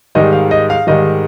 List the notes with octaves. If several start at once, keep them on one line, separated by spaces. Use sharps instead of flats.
G#2 D#3 G3 D#5
F5
D#5
F5
G#2 D#3 G3 D#5